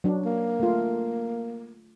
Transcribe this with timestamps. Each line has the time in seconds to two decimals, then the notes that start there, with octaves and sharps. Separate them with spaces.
0.04 F#3 D4
0.25 A#3
0.60 A3 F4